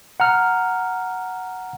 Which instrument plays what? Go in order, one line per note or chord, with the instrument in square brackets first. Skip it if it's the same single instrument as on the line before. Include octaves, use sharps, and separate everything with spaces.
[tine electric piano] F#5 A#5 F6